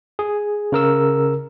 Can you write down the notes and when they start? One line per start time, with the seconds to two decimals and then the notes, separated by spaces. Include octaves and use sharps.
0.19 G#4
0.72 C#3 A#4 E6